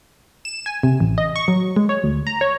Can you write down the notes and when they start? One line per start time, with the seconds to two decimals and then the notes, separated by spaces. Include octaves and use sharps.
0.45 E7
0.66 G#5
0.83 C3
1.00 A1
1.18 D#5
1.36 C#6
1.48 F#3
1.76 G#3
1.89 C#5
2.04 D2
2.27 A#5
2.41 C#5